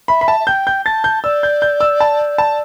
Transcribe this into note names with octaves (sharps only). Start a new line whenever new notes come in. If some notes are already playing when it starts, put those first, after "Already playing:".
E5 B5
B5
A5
E5
G5 G6
G6
A5 A6
G6
D5 E6
G6
G6
E6
A5
A5